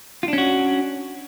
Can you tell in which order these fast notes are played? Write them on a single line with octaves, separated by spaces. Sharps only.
F4 D4 C#4 F#4